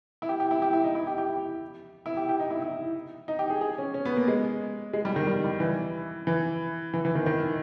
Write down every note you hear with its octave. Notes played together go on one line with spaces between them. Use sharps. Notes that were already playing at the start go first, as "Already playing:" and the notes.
E4
G4
G4
E4
G4
E4
D#4
E4
G4
G4
E4
E4
G4
G4
D#4
E4
E4
D#4
G4
G#4
G#4
C#4
C#4
B3
A#3
G#3
G#3
G3
D#3
G3
G3
E3
E3
E3
E3
D#3
D#3